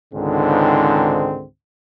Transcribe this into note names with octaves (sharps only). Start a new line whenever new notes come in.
C#2 G#2 D3 D#3 C4